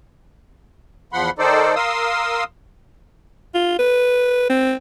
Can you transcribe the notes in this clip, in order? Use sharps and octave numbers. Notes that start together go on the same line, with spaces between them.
E2 F3 F#5 B5 C6
D#3 D#4 A4 C5 D5
A#4 F5 C6 D#6 E6
F4
B4
C4